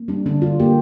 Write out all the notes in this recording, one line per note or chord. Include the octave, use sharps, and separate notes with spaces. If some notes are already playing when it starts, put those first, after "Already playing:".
Already playing: A#3
G3 D4
D3 D4
D3 F4
A#3 G4